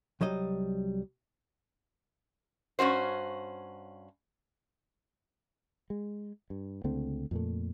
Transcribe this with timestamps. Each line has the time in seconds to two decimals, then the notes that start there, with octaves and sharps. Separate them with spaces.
0.21 C2 F#3 G3 D#5
2.79 G2 C#4 F#4 C5
5.90 G#3
6.50 G2
6.84 C#2 D3 A3 C4
7.31 F2 A#2 A3